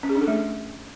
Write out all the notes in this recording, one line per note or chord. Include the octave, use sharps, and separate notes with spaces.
C#4
G#4
D4
A4
A3